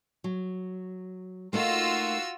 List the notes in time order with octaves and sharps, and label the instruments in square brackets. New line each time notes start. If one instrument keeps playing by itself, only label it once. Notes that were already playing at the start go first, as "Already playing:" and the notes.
[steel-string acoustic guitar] F#3
[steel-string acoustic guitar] A3 A#3 D#4 [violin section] F4 F#4 E6